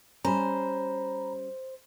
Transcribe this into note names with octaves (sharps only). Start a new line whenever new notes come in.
G3 C#4 C5 A#5 B5